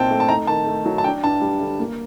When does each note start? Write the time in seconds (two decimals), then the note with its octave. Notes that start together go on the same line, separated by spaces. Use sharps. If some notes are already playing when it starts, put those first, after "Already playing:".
Already playing: A#2 F#3 C4 D#4 G5 A5
0.11 A3
0.20 A5
0.29 D#4 A#5
0.47 D#3 A5
0.66 A3
0.86 F#3
0.98 A5
1.04 D4 G5
1.24 G2 A5
1.42 G3
1.61 D3
1.80 A#3